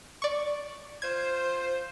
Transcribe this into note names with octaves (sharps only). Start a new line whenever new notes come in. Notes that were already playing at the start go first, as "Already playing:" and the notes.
D5 C#6
F4 C5 G#6